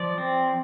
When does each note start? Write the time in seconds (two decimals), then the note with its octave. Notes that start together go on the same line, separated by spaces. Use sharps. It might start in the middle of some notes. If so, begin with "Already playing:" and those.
Already playing: F3 D5
0.18 C4